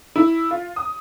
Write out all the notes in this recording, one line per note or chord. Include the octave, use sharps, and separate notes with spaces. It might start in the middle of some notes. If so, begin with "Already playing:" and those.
E4
F4
D#6